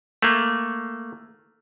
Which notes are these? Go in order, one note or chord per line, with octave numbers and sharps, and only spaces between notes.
A3 A#3